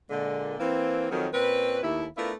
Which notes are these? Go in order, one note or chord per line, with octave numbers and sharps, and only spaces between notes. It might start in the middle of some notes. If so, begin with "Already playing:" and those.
A#2 D3 G#3
E3 A#3 C4
F2 D#3 F#3
A#2 C4 C#4 B4
D#2 A3 E4
A3 B3 D4 E4 F4 A#4